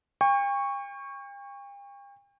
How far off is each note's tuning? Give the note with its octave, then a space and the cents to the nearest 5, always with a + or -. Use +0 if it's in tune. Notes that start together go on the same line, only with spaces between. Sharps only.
G5 +40 C#6 -5